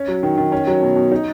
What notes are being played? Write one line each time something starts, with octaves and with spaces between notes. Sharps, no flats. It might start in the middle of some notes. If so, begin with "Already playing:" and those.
Already playing: C#4
F#3
D#3
D#3
C#4
F#3
B2
B2
D#4